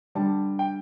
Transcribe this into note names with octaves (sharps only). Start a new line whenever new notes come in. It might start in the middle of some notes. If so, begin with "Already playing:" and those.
D3 G3 A5
G5